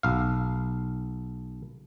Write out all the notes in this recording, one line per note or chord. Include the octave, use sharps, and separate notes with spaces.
B1 F5